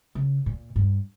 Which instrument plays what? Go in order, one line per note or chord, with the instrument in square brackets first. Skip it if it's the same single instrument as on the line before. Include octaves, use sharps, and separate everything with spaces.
[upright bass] C#3
A#2
G2